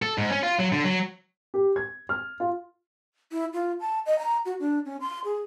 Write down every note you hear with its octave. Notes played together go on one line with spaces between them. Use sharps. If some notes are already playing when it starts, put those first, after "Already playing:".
A4
G#2
C#4
F4
F#3
D3
F#3
G4
G#6
F6
F4
E4
F4
A5
D#5
A#5
F#4
D4
C#4
C6
G#4